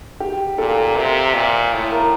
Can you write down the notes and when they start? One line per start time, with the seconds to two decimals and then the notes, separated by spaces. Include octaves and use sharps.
0.20 G4
0.58 A#2 A4
0.96 C3 A#4
1.34 A#2
1.73 A2
1.92 A#4